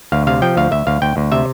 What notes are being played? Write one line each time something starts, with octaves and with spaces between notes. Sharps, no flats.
D2 F5
C3 F5
F3 G5
D2 F5
D2 E5
D2 F5
D2 G5
D2
C3 E5